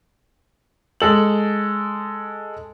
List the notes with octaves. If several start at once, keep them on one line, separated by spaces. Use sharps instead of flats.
G#3 A4 F#7